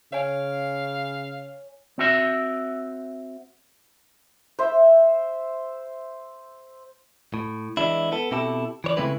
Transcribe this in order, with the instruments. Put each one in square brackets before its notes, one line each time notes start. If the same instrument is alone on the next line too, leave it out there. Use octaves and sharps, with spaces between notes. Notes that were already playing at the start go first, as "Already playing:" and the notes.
[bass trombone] C#3 [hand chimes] C#5 G#5 [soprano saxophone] F5
[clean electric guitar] C4 F#4 E5
[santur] C5 E5
[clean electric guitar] A2
E3 G#3 D4 E4
B3 A4
B2 C4 E4 G4 A4 A5
E3 C#5 D5
C#3 G#3 A3 C4 E4 B4